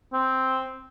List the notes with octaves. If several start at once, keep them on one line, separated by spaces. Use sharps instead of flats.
C4